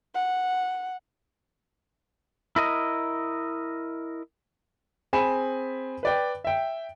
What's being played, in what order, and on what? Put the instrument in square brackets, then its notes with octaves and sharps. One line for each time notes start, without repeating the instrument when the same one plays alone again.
[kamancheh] F#5
[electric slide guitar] E4 A#4 D#5
[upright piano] C4 G#4 G#5 B5 E7
B4 D5 G5
E5 G5